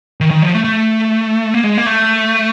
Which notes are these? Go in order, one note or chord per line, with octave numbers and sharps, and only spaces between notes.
D#3
D#3
F3
A3
A3
A#3
G#3
A#3
A3